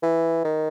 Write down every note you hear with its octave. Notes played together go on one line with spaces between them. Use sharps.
E3
D#3